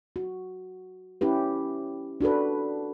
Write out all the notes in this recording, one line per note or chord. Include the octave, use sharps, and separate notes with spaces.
F#4
C#4 E4 G4 B4
D4 F#4 A4 B4